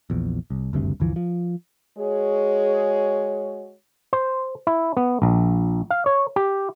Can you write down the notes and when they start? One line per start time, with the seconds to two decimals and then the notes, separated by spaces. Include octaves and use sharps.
0.10 A#1 E2
0.50 C2
0.73 F#1 D2 G2 C3
1.00 G1 D2 E3 F3
1.16 F3
1.97 G#3 F#4 G#4 C#5
4.13 C5
4.67 E4
4.97 B3
5.22 A#1
5.91 F5
6.06 C#5
6.36 G4